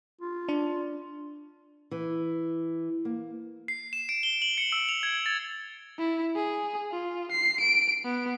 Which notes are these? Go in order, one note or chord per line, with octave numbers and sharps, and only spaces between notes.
F4
D4
E3
A#3
C7
E7
D7
G7
F#7
C#7
E6
F7
G#6
A6
E4
G#4
F4
C7
D7
B3